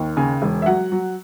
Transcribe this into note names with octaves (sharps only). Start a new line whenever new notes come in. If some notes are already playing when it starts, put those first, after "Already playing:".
Already playing: D#2
C#3 G#5
E1
E5
F#3 F#5
F#3